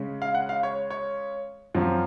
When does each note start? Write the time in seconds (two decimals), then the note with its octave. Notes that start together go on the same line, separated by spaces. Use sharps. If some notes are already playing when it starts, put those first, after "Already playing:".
Already playing: C#3 G#3 C#4
0.22 F5
0.34 F#5
0.49 F5
0.63 C#5
0.90 C#5
1.75 F#2 F3 C4